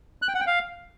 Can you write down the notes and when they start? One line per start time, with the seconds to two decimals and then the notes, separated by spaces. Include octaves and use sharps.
0.22 F#6
0.28 G5
0.34 F#5
0.41 G5
0.47 F5